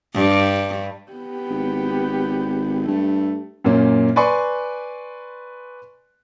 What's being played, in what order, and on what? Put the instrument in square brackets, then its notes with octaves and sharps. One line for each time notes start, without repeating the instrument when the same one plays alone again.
[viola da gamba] G2
[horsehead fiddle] B3 G4
[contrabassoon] G#1
[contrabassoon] G2 [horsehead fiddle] A3
[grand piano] F#2 A#2 A#3 C#4
B4 D5 G#5 C6 C#6